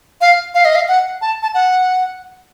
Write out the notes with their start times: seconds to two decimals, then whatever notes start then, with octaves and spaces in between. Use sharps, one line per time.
0.21 F5
0.55 F5
0.65 D#5
0.75 F5
0.88 F#5
1.21 A5
1.43 A5
1.54 F#5